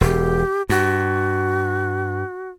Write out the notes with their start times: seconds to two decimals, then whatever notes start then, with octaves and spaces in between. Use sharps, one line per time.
0.01 E1 G4
0.69 G2 F#4